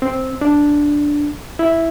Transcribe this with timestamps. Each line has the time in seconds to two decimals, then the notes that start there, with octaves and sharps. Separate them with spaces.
0.02 C4
0.41 D4
1.59 E4